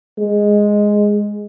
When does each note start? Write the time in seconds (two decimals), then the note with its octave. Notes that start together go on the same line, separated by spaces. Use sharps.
0.18 G#3